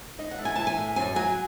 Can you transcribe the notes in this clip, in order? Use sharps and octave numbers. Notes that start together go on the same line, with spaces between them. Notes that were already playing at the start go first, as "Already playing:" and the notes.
D#4 D#5
F#5
A3
G#5
E3 A5
G#5
A2
F#2 G#5
F#3 G#5